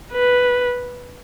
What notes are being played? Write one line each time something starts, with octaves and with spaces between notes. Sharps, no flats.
B4